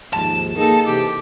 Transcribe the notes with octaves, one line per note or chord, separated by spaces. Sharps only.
D#2 G#2 F3 A5
A#3 D#4 G#4 A4
C3 E3 G4